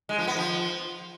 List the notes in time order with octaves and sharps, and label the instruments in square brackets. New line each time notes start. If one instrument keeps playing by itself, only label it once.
[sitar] G#3
F3
B3
F3